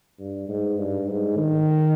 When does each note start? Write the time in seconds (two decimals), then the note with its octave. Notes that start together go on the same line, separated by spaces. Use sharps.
0.19 G2
0.49 G#2
0.78 G2
1.08 G#2
1.37 D#3